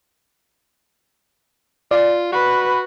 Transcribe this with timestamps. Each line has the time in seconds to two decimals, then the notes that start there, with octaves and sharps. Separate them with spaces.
1.91 F4 D5
2.33 F#4 B4